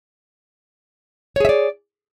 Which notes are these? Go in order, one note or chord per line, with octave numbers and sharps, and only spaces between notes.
G#4 C#5 D5 E5